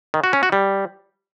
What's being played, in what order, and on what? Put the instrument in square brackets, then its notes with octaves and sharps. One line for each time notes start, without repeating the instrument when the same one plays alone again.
[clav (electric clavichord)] D#3
F#4
C#4
F#4
G3